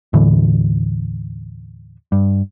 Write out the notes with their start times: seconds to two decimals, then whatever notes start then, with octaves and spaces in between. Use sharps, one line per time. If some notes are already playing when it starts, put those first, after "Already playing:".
0.13 D#2 A2 D3 E3
2.12 G2